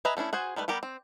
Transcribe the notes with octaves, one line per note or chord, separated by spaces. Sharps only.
G#4 B4 D#5 E5 A#5
A3 C#4 D4 E4
F#4 G#4 C5 G#5
D#3 G3 A3 B4
G3 B3 G4 A#4
C4